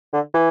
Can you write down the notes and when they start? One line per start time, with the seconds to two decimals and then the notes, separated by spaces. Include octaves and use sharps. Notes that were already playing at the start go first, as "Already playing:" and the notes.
0.13 D3
0.34 E3